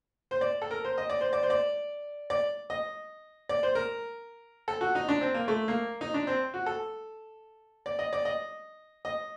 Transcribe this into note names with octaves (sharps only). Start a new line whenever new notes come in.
C5
D5
A4
A#4
C5
D#5
D5
C5
D5
C5
D5
D5
D#5
D5
C5
A#4
A4
F#4
D#4
D4
C4
A#3
A3
A#3
D#4
D4
C4
F#4
A4
D5
D#5
D5
D#5
D#5